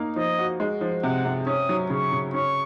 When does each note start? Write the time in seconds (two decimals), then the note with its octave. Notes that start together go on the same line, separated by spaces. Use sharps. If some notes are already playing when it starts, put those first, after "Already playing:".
Already playing: A#3 D#4
0.16 F3 D#5
0.39 F#4
0.60 G#3
0.81 F3
1.03 C3 F#5
1.25 C3
1.47 C#4 D#6
1.69 F#3
1.90 C#3 C#6
2.12 C#3
2.34 C#4 C#6